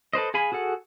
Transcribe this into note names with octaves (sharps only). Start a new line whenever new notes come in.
A4 B4 C5 D#5
G#4 F5 G#5 B5
F#4 G#4 A4 F#5